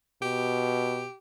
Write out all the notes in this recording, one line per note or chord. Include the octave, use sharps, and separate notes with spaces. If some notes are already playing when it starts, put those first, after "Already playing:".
B2 G4